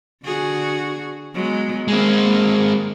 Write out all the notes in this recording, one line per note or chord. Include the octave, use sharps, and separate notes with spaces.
D3 F#4 G#4
F#3 G#3 B3
G#3 A#3 C4
A#3